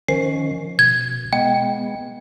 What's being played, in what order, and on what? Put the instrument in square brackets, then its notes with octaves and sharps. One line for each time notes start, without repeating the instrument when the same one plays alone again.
[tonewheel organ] D#3 F3 C#4 [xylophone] C7
[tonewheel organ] B2 [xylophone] G#6
[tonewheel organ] G#3 B3 [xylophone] G5